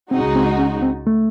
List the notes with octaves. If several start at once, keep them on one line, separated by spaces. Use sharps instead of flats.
C#2 C#3 G#3 C4 D#4 F#4
C4
C#4
C4
A3